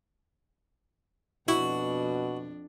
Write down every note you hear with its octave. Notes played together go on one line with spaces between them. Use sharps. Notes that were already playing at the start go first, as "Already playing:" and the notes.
F2 B2 D4 E4 F#4